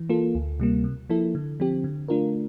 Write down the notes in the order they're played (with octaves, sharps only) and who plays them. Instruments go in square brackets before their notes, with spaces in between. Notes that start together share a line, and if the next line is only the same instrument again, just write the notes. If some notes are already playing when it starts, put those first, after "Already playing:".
Already playing: [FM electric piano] E3
A#3 F4 A4
D2
C3 G3 A#3
C3
F3 A#3 E4 A4
D3
F3 C4 G4
D3
A3 D4 F4 A#4